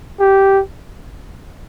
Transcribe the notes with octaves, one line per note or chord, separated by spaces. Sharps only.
G4